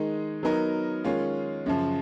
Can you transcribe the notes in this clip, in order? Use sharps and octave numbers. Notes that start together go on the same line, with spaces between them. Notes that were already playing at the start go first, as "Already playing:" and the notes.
Already playing: D#3 G#3 D#4
F#3 B3 D#4 A#4
D#3 G#3 C#4 F4
F#2 C#3 F3